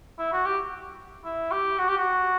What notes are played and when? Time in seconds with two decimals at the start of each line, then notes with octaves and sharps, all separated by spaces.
0.18 E4
0.32 F#4
0.45 G4
1.25 E4
1.52 G4
1.78 F#4
1.88 G4
1.97 F#4